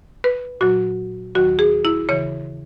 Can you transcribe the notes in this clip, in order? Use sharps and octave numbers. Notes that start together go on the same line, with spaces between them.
B4
A#2 F#3 F#4
D#2 D#3 F#3 F#4
G#4
E4
C#3 E3 C#5